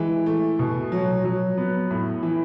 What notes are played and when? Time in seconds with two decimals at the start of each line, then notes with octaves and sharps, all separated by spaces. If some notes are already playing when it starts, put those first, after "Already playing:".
Already playing: E3 G#3
0.26 A3
0.59 B2
0.92 F#3
1.25 F#3
1.58 B3
1.90 A2
2.23 E3